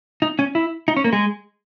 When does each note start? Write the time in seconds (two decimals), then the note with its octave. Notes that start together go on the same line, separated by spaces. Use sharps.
0.22 D#4
0.39 C#4
0.55 E4
0.88 D#4
0.97 C#4
1.04 A#3
1.13 G#3